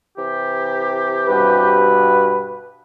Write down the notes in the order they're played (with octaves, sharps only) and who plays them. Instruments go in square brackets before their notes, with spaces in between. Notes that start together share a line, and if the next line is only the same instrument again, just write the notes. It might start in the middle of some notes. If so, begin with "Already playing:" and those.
[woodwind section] C3 E3 G4
[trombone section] G2 B2 B4